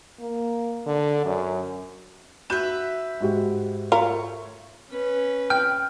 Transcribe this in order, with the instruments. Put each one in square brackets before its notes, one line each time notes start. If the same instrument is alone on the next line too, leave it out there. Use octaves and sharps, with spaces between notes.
[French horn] A#3
D3
F#2
[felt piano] F#4 G6 E7 [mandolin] B4 E5
[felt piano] G#2 F#4 G4
[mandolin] A3 C#5 [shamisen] F4 A#4
[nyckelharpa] C#4 B4
[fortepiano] G5 [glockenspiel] F6